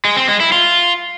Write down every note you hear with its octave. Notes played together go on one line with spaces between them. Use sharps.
G#3
C4
G#3
E4
F4